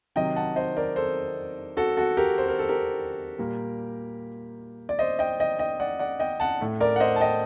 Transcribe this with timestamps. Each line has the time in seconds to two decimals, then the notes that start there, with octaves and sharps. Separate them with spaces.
0.16 C3 D#3 F#3 D#5 G5
0.36 F#5 A5
0.56 C5 D#5
0.77 A#4 D5
0.96 A4 C5
1.77 F#4 A4
1.97 F#4 A4
2.17 G4 A#4
2.38 C5
2.49 A#4
2.59 A4
2.69 G4 A#4
3.39 A#2 G3 A#3
4.89 D5
4.99 C5 D#5
5.19 D#5 G5
5.40 D#5 G5
5.59 D#5 G5
5.80 D5 F#5
5.99 D5 F#5
6.20 D#5 G5
6.40 F#5 A5
6.61 A2 A3
6.80 A#4 D5
6.96 F#5
7.00 C5 D#5
7.16 A5
7.21 D#5 G5